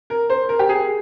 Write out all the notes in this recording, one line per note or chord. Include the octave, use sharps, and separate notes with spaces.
A#4
C5
A#4
G4
G#4